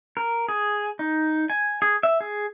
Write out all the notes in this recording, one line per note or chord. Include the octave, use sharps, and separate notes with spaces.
A#4
G#4
D#4
G#5
G#4
E5
G#4